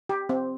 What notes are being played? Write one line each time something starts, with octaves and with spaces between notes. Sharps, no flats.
G4
C4